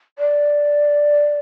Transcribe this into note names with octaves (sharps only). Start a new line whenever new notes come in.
D5